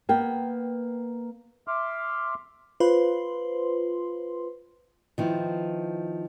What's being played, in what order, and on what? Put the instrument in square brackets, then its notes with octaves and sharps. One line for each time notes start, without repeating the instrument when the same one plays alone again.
[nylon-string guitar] A#3 B3 G5
[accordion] E5 C6 D6 F6
[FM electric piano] F4 B4 C5 C6
[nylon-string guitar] D#3 F3 B3 E4